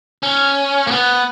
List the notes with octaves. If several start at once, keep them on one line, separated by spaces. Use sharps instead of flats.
C#4
A#3
B3